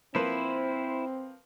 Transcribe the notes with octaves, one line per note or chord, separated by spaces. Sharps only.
F3 A#3 C4 E4 B4 C5